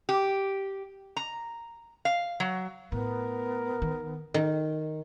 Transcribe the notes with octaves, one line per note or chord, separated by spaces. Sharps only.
G4
A#5
F5
F#3
A2 B3 A#4
D#3
D#3